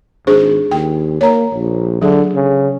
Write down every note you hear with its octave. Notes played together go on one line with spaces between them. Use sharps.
G#1 D4 G#4 C5
D#2 G5
A#3 C#5 A#5
A#1
D3 F#3 G#4
C#3